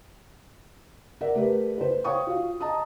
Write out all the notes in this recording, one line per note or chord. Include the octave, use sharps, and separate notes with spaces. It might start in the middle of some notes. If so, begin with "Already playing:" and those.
A#4 D5 E5 F#5
A3 G4 A#4 B4
B4 C5
C5 C#5 F5 G5 C#6 D#6
F4 F#4 F5
D#5 A5 A#5 D#6